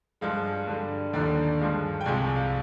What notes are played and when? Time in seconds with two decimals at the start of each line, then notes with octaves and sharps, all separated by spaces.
0.21 G2 F3 G#3 F5
0.67 G2 D3 G3
1.14 D#2 D3 F3 D5
1.60 G2 F3 G#3
2.01 G5
2.06 C2 C3 F3 G#3 G#5
2.36 F5